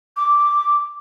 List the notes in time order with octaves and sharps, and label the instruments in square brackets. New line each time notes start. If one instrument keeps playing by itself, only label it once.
[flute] D6